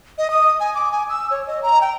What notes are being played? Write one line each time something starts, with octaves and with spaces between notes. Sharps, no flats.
D#5
D#6
G#5
D6
G#5
E6
C#5
D#5
A#5
G5